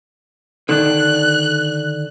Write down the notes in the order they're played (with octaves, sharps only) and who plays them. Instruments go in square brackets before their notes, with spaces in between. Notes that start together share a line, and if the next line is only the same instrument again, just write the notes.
[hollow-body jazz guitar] D3 D#3 D4 [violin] F#6